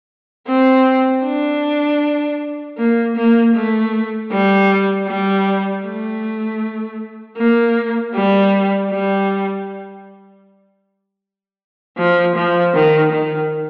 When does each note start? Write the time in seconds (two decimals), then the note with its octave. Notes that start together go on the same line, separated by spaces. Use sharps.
0.47 C4
1.24 D4
2.78 A#3
3.16 A#3
3.54 A3
4.31 G3
5.07 G3
5.84 A3
7.37 A#3
8.15 G3
8.90 G3
11.97 F3
12.35 F3
12.74 D#3
13.12 D#3